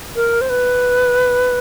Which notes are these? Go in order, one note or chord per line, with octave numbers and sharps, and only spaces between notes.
A#4
C5
B4